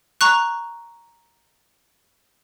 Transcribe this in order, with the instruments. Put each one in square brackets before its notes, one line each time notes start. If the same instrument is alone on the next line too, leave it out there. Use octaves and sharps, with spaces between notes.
[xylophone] A#5 C#6 F#6